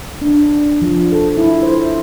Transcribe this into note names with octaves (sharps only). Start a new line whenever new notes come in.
D4
F3
A4
E4
C5